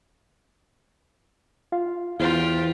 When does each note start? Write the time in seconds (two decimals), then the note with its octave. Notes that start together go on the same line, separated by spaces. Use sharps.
1.72 F4 F5
2.20 E2 E4 F4 G4 C5 F5